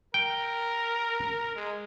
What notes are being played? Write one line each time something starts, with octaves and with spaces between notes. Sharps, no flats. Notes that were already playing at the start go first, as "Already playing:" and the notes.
A#4 G5
G#3